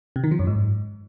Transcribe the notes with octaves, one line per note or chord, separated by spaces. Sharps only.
C3
D#3
F3
F#2
G#2